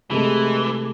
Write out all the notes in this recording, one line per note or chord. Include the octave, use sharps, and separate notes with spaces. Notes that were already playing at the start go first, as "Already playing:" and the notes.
C3 E3 G#3 A3